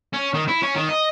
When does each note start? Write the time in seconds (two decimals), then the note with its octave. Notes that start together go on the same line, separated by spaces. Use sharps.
0.13 C#4
0.34 D#3
0.48 E4
0.62 C#4
0.75 D#3
0.89 D#5